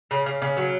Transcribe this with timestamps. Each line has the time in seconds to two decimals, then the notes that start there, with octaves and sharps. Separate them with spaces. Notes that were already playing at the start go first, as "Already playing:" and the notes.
0.11 C#3
0.26 C#3
0.42 C#3
0.57 F#3